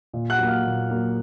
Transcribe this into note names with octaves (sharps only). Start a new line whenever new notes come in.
A#2
F#5 F#6
F#3 A#3
F5 F6
A#2
F#3 A#3